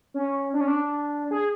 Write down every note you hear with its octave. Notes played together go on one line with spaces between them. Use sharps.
C#4
D4
C#4
D4
G#4